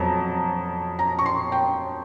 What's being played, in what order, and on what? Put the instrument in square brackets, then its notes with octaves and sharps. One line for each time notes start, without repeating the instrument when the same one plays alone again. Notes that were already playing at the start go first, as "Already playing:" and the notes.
Already playing: [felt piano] F2 F#3 A#5
A#5
C#6
C6
G5